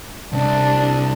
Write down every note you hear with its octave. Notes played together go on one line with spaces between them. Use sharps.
C2 D4